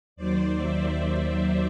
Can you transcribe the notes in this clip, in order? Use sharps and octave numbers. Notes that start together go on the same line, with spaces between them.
D#2 D#3 F#3 C5 D5
D5 E5
C5 D5